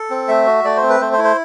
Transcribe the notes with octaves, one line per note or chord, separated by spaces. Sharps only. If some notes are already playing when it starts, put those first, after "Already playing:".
Already playing: A4
C4
A3 E5
F#4
A3 D5
C5
C4
B4
A3 C5
C5
E4
C5